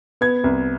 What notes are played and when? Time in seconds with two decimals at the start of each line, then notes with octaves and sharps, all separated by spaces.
0.21 B3 G#6
0.44 C2